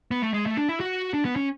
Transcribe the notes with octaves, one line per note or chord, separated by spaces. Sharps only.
B3
A3
G#3
A3
D4
E4
F#4
D4
B3
C#4